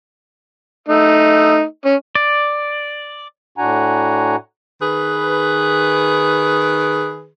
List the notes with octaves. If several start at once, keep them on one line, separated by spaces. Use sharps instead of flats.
A3 D#4
C#4
D5
A2 D4 F#4 F#5 G#5 A#5
D#3 G#4 B4